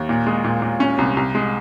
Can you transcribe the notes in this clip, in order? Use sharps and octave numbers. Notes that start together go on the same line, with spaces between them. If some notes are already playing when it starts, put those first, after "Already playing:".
Already playing: D#2
A#2
G#3
A#2
A#2
C#4
C2
C2
G#3